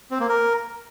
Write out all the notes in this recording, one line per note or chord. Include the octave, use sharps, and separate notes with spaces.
C4
A#3
A#4